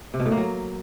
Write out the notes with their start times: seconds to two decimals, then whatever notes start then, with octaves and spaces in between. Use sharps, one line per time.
0.14 C3
0.20 B2
0.26 A2
0.31 A#3
0.37 F#3